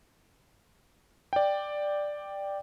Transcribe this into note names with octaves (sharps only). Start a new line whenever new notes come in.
D5 G5